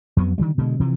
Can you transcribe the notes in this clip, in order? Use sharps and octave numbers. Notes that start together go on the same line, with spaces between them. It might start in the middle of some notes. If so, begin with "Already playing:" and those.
F2 F#3 B3
D3 D#3 F#3 G3
B2 D3 G#3
C3 E3 F3